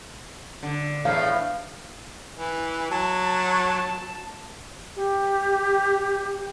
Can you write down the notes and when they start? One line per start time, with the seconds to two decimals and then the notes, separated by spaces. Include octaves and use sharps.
0.63 D3
1.05 E2 A2 A3 F5
2.36 E3
2.91 F#3 A5
4.96 G4